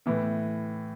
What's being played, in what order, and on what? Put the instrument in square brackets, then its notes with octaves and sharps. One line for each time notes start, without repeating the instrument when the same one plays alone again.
[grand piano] A2 E3 B3